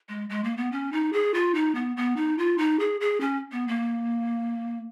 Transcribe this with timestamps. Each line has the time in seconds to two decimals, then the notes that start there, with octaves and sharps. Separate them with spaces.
0.09 G#3
0.30 G#3
0.44 A#3
0.57 B3
0.72 C#4
0.92 D#4
1.13 G#4
1.34 F4
1.55 D#4
1.75 B3
1.97 B3
2.16 D#4
2.38 F4
2.58 D#4
2.79 G#4
3.01 G#4
3.21 C#4
3.52 B3
3.68 A#3